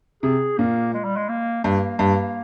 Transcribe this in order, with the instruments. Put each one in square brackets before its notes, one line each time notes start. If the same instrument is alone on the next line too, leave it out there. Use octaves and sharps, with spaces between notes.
[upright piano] C3 [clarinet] G#4
[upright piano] A#2 [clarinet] A#3
[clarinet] G#3
G3
G#3
A#3
[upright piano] G2 [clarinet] A#3
[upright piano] G2